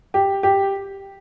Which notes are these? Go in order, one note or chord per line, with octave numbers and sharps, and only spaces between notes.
G4
G4